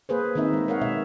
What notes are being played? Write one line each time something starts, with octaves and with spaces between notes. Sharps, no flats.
A#3 G#4 B4 C5
D#3 A#3 C4 D#4 E5
G#3 A#3
A#4 C#5 F5 F#5
B2 E5